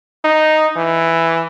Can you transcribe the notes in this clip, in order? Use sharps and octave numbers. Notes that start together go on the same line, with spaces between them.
D#4
E3